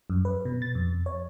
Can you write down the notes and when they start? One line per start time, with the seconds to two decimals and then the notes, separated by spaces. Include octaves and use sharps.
0.10 F#2
0.25 B4
0.45 B2
0.62 A6
0.75 F2
1.06 C#5